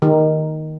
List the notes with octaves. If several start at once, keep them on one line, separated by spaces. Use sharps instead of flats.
D#3